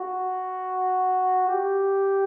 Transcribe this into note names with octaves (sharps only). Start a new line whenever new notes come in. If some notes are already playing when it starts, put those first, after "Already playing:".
Already playing: F#4
G4